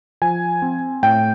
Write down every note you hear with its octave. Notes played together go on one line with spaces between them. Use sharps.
F3 G#5
C4
A2 G5